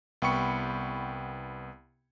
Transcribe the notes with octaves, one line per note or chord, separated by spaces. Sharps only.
C2 B3 G5 B5 C#6 C#7